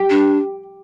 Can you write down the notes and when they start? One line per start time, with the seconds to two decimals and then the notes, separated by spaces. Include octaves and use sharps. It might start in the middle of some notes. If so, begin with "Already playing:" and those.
Already playing: G4
0.10 D4